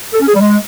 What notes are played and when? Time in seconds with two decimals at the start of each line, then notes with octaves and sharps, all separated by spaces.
0.14 A4
0.20 C#4
0.27 G#4
0.33 G3
0.40 G#3